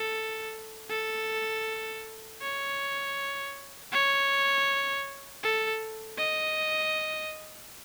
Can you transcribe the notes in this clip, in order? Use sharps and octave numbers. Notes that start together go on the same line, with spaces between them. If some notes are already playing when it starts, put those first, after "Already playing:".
Already playing: A4
A4
C#5
C#5
A4
D#5